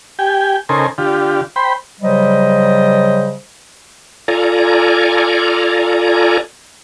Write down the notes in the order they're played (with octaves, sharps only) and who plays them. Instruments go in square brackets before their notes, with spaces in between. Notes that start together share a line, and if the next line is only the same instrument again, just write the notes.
[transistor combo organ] G4 G5 G#5
C#3 D#4 A4 A#4 C5 G#5
D3 F4 G4
C5 G5 B5
[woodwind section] C#3 F#3 G3 C5 D#5
[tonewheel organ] F4 A4 D5 G#5 A#5